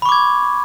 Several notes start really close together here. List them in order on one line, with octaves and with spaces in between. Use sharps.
B5 C#6 D6 G#6